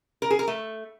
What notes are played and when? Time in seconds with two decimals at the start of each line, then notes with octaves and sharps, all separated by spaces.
0.22 A#4
0.30 G#4
0.39 A#4
0.48 A3